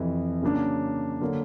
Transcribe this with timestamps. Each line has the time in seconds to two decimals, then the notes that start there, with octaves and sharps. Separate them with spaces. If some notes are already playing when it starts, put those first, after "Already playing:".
Already playing: F2 C3 E3
0.42 C#3 F#3 A#3 D4
1.21 D3 F#3 A#3